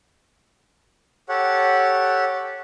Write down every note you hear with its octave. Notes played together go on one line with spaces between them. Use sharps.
G4 A4 C#5 F#5